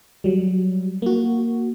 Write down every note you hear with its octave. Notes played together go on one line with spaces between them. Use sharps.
F#3 G3
A#3 F#4